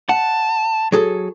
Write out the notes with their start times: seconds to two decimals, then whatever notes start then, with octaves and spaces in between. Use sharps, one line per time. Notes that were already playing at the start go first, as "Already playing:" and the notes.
0.09 F#5 A5
0.92 F#3 G#4 A4